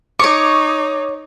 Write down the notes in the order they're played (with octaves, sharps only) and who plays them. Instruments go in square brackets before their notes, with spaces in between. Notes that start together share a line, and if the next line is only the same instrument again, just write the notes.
[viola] D#4 [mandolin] C#5 C#6 [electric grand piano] D6